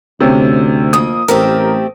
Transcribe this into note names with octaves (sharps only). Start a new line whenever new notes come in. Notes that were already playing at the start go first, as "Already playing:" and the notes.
D2 C3 C4 C#4
F2 A#3 D#6
A1 A3 C4 G4 A#4